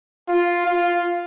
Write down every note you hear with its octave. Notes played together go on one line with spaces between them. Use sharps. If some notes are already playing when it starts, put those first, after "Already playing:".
F4
F4